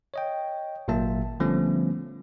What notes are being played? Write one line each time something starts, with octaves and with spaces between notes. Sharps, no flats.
C#5 D#5 G5
G#1 A#2 F#3 A#3 E5 A5
D3 F3 G3 A3 B3 C#4